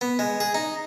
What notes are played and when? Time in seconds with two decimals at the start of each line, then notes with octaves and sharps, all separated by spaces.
0.01 B3
0.19 G#3
0.40 G#4
0.54 D#4